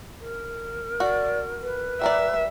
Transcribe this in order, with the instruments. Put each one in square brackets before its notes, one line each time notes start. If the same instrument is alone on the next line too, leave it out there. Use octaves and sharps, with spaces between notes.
[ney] A#4
[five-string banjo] F#4 [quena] D5
[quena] B4
[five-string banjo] G3 A#4 D5 [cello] E5